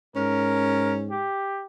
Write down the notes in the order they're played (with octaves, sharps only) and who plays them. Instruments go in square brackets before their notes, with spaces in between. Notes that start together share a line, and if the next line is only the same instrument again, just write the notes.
[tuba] G#2 [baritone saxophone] C#4 [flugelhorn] A#4
[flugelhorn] G4